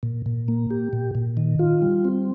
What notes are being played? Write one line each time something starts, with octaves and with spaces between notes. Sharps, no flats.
A#2
A#2
A#3
G4
A#2
A#2
D#3
F4
G3
C4